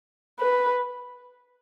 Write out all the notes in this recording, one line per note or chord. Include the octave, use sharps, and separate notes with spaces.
B4